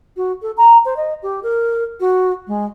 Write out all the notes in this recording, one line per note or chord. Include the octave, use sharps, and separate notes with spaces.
F#4
A4
A#5
C5
D#5
G4
A#4
F#4
G#3